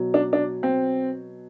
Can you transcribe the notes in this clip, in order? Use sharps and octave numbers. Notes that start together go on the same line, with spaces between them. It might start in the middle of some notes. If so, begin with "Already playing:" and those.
Already playing: B2 F#3
D4
D4
C4